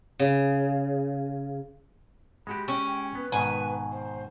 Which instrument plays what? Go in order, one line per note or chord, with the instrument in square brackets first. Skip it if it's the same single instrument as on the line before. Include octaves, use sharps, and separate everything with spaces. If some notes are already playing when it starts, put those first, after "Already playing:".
[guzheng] C#3
[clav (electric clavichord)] G#3 F#4 G4 [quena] B5
[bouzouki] C#4 [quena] G5
[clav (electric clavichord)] B3 [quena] B4
[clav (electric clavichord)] G#2 B2 D#3 [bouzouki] G#5
[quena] C5